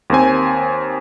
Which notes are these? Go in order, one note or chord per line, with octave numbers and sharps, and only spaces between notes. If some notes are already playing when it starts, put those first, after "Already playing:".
D#2 A#3 C4 G#5